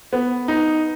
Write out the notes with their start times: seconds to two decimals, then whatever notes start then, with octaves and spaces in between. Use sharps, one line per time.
0.13 B3
0.48 D#4